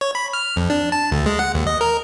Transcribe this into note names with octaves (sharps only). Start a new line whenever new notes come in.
C#5
B5
F6
F2
D4
A5
D2
G#3
F#5
D#2
D#5
A#4